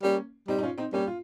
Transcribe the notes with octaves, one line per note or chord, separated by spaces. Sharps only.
G3 A#3 C#4
G3 C4 D#4
D#4
C#4 F4
C4 D#4
G3 A#3 C#4
F4